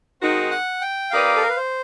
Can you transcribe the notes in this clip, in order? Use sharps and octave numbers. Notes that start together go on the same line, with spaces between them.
D#3 G#3 C4 D#4 F#4
F#5
G5
A#3 D#4 G4 B4 D5 F5
A4
A#4
B4
C5